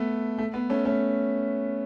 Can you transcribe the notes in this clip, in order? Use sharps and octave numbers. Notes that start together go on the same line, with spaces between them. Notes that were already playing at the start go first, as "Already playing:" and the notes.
Already playing: A3 B3
A3
B3
A3 C#4
A3 C#4